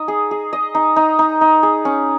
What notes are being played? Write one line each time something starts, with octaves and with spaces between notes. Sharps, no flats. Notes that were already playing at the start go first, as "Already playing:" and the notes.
Already playing: D#4 D#5
G#4
G#4
D#5
D#4
D#4
D#4
D#4
G#4
C#4